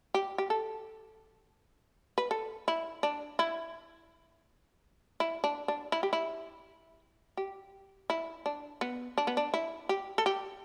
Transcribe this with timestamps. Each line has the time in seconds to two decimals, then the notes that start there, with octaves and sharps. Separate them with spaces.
0.14 G4
0.38 G4
0.50 A4
2.18 B4
2.31 A4
2.68 E4
3.03 D4
3.39 E4
5.20 E4
5.44 D4
5.68 D4
5.92 E4
6.03 G4
6.13 E4
7.37 G4
8.10 E4
8.46 D4
8.81 B3
9.18 D4
9.27 B3
9.37 D4
9.54 E4
9.89 G4
10.18 A4
10.26 G4